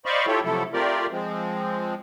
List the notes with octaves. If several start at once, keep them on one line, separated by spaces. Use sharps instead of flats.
C5 D5 D#5 F5 B5 C#6
E4 F4 G4 A4 C#5
C3 F3 F#3 A3 E4 A4
A3 C4 F4 G4 A#4 D5
F3 G#3 C4